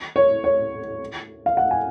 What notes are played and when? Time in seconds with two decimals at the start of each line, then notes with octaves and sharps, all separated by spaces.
0.16 C#5
0.44 C#5
1.46 F5
1.57 F#5
1.71 G#5